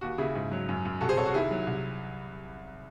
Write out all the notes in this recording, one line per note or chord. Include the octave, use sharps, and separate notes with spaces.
D#2 F#4
C#3 E4 G#4
G#2
F#3
F#2
F#2
C2 F#4 A4
G#4 C5
C2 A4 C#5
F#4
D#3 E4 G#4
F#3
C2